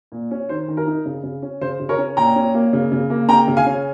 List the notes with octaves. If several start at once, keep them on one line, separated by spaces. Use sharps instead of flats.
A#2
C#4
D#3 C5
D#3
A#4
D#4
C#3
C#3
C#4
C#3 C5
C#3
A#4 C#5
C#4
A#2 G5 A#5
C#4
A#3
C#3
C#3
A#3
C#3 G5 A#5
C#3
F5 G#5
C#4